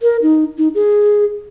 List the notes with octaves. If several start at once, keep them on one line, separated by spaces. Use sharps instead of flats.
A#4
D#4
D#4
G#4